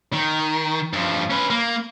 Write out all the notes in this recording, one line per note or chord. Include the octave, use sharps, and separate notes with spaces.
D#3
G2 F3
C#4 B4
A#3